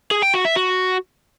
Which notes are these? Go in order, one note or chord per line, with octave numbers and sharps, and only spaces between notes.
G#4
G5
F#4
E5
F#4